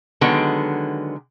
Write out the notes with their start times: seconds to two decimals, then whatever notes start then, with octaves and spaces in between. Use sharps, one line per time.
0.21 D3 D#3 F#3 G#3 B3